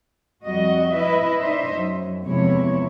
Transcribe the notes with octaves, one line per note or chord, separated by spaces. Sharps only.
F2 G3 F#4 D#5
E4 B4 D#5 E5
D4 D#4 C5 D#5 E5
F#2
E2 C3 F3 G#3 E4 C#5